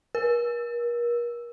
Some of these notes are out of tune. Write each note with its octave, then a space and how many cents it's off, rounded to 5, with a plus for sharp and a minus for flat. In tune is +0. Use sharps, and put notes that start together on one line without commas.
A#4 +40